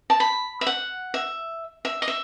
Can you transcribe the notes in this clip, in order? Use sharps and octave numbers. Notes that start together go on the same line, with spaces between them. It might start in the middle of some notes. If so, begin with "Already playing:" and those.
A5
B5
E5
F#5
E5
E5
D#5
E5